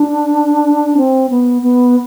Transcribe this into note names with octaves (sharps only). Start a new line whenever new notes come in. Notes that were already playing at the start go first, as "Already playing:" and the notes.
Already playing: D4
C4
B3
B3